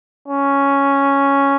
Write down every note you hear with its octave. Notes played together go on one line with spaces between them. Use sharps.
C#4